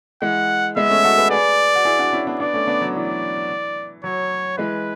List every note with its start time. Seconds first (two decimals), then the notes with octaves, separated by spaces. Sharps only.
0.22 E3 G#3 F#5
0.76 G#3 B3 E5
0.90 A3 C#4
1.03 F#4 A4
1.18 G#4 B4
1.31 G#4 B4 D5
1.75 F#4
1.85 E4 G#4
1.99 D4 F#4
2.13 C#4 E4
2.27 B3 D4
2.40 B3 D4 D5
2.54 A3 C#4
2.68 B3 D4
2.81 F#3
2.95 E3 D5
4.04 F#3 C#5
4.58 E3 G#3 B4